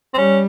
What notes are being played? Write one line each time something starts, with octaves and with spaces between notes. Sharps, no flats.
C4
G3 C#4